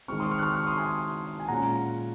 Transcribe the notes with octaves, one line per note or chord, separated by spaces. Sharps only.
D#3 G#3 C4 C#6 F6
C6 D#6
C#6 F6
F#6
C#6 F6
C#6 F6
C6 D#6
G#5 C6
G#5
A#2 G#3 C#4 F4 F#5 A#5